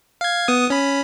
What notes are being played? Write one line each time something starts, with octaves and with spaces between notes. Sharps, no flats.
F5 G#6
B3 D#6
C#4 B5